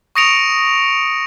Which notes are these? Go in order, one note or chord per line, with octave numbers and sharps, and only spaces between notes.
C#6 D#6 A#6 C#7 D7 F7